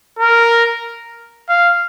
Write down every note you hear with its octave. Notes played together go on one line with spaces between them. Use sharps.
A#4
F5